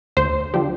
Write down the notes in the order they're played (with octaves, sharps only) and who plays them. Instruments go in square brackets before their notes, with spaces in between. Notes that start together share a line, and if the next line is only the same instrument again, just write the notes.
[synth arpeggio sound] D2 C5
D3 F3 G4